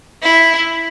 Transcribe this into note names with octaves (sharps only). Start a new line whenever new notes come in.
E4